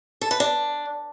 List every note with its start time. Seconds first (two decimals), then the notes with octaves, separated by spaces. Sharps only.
0.21 A4
0.31 B4
0.40 D4